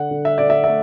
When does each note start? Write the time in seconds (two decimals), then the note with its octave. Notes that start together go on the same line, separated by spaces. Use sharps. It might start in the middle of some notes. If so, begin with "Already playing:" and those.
Already playing: D3 F#5
0.11 D3
0.25 E5
0.38 D3 D5
0.50 E5
0.64 E5
0.67 A3